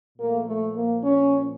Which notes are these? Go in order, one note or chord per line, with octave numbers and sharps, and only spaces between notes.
A#2 F3 A3 A#3
A3
A#3
C#4